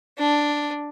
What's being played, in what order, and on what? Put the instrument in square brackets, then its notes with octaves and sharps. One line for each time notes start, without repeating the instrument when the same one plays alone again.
[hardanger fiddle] D4